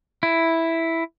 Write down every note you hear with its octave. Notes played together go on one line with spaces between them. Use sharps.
E4